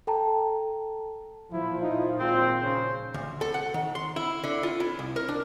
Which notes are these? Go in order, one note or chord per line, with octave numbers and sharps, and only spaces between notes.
A4 G5 A5 A#5
A#2 F3 E4
D#4 F4
G#1 C4
C#3 C5
D2
A4
F#5
D#3
C6
E4
D3
F4
E4
C2
A#4
D4